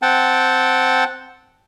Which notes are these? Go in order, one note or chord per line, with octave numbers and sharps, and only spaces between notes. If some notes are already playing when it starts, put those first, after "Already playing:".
C4 F#5 G5 A5